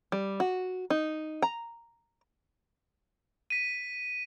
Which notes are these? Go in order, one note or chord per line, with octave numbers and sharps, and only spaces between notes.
G3
F#4
D#4
A#5
B6 D#7